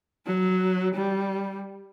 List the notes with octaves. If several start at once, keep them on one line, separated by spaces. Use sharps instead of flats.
F#3
G3